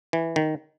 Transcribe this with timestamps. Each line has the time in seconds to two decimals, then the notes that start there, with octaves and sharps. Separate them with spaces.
0.13 E3
0.36 D#3